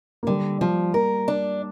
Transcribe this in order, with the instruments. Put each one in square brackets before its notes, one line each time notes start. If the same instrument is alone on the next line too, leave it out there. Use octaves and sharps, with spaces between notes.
[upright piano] A#3
[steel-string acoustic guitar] D3 [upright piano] G3
[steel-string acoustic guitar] F3 [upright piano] G3
[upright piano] A#3 [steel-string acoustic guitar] A#4
[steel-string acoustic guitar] D4